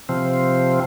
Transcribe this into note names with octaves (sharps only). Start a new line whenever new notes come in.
C3 F3 C4